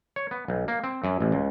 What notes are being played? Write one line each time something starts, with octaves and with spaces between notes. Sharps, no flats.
C#5
B3
B1
A#3
C4
F#2
A1
C#2